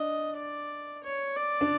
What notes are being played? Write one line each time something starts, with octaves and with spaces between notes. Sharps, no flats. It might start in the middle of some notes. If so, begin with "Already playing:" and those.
Already playing: D4 D#5
D5
C#5
D5
D4